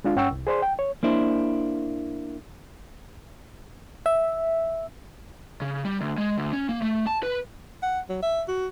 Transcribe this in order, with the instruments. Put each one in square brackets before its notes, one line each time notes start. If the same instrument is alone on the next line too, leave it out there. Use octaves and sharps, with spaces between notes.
[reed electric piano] G#3 D4 F4
G2 C#4 F#5 G5 C#6 E6
C2
G#4 C5 D5 C6
G5
C#5
[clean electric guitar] A#3 D4 E4 C5
[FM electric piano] E5
[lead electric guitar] C#3
G3
D2
G#3
D2
C#4
A#3
A3
A5
B4
[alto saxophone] F#5
F#3
E5
F#4